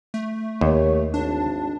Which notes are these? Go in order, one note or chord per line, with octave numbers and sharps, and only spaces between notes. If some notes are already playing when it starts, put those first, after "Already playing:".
A3
D#2 G4 A#4 C#5
G#1 D4 A5